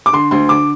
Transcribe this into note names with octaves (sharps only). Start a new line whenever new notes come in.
D6
D3 C6
D2 C6
D3 D6